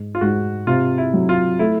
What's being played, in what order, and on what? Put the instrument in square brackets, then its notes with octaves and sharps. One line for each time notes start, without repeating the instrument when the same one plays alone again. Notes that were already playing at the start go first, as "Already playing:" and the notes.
Already playing: [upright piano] G#2
[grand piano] F4
[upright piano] G#2 [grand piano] F#4
[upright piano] C3 [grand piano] F4
[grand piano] E4
[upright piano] F#3
[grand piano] F4
[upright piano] A3 [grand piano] E4